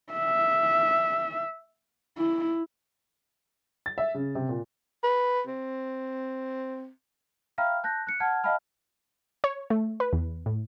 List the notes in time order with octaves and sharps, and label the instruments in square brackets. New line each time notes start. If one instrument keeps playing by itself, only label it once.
[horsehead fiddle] E5
E4
[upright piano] A6
E5
C#3
C3
A#2
[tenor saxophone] B4
C4
[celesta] E5 F5 G5 A#5 B5 F6
A5 F#6 G6 A#6
F#6 C#7
F#5 A5 F6 G#6
D#5 F5 G5 A5 B5 F6
[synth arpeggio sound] C#5
A3
B4
E2
A2